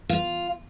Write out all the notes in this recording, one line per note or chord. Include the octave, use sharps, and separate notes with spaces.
F4